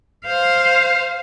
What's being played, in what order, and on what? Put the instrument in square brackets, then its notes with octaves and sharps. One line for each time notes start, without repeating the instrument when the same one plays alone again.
[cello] C5 F5